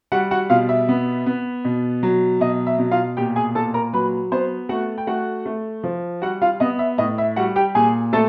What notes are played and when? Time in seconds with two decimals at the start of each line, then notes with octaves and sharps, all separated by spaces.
0.12 G3 F#4 F#5
0.31 F#4 F#5
0.50 B2 F4 F5
0.69 E5
0.89 B3
1.26 B3
1.65 B2
2.03 F#3
2.41 B2 D#5
2.67 E5
2.79 B2
2.91 F4 F5
3.17 A#2 G4 G5
3.36 G#4 G#5
3.55 A#2 A4 A5
3.74 A#4 A#5
3.93 F#3 B4 B5
4.32 B3 C5 C6
4.69 A3 F#4 F#5
4.98 G5
5.07 A3 F#4 F#5
5.46 A3
5.84 F3
6.22 G3 F#4 F#5
6.42 F4 F5
6.60 B3 D#5
6.79 E5
6.98 A2 D#5
7.18 E5
7.36 G3 F#4 F#5
7.56 G4 G5
7.75 A#2 G#4 G#5
8.13 A3 A4 A5